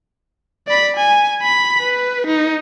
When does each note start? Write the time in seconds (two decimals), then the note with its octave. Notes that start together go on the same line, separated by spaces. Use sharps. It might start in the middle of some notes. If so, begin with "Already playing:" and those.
0.68 D5 B5
0.96 G#5
1.43 B5
1.82 B4
2.27 D#4